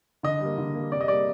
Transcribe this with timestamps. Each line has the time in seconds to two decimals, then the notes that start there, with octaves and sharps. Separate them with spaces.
0.23 D3 D#5
0.40 G3 A#3
0.58 D3
0.75 G3 A#3
0.91 C3 D5
1.01 D#5
1.08 G3 A#3 D5